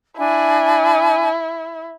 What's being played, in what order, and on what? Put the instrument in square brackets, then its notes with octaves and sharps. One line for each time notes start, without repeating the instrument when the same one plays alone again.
[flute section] D4 G#5 [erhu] E4